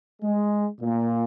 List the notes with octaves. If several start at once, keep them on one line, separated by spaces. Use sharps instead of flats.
G#3
A#2